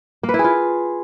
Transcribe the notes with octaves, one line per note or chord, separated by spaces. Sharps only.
A#3
B4
E4
G#4
F4